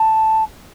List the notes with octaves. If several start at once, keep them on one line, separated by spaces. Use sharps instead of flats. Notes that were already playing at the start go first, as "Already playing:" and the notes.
Already playing: A5